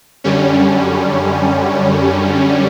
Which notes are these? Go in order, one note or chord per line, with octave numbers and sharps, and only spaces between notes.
F#2 D3 G3 C#4